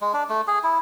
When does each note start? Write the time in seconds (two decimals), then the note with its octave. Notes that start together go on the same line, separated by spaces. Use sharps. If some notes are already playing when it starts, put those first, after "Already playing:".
0.01 G#3
0.13 D4
0.29 A3
0.47 G#4
0.63 E4